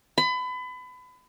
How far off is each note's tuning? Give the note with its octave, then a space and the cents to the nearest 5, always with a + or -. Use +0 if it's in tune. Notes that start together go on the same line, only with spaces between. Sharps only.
B5 +30